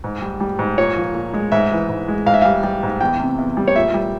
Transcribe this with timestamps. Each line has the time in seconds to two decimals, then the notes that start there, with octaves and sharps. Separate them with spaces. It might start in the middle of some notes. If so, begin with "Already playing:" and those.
0.04 G#2
0.22 G3
0.40 G3
0.59 G#2
0.78 A#2 C#5
0.96 F3
1.14 A#2
1.33 G#3
1.52 G#2 E5
1.71 E3
1.89 G#2
2.08 G#3
2.26 G#2 F5
2.34 E5
2.42 G3 F5
2.63 G3
2.83 G#2
3.01 E2 G5
3.20 C3
3.38 E2
3.57 G3
3.68 C#5
3.75 A#2 E5
3.94 G3